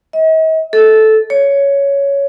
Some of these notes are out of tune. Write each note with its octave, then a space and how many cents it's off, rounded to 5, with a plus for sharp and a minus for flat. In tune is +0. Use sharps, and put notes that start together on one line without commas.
D#5 +45
A4 -10
C#5 +10